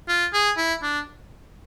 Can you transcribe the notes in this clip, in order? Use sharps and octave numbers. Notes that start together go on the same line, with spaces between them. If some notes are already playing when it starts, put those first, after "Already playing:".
F4
G#4
E4
D4